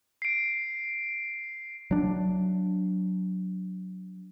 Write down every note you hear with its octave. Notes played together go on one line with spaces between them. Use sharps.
C7 D7
F#3 D4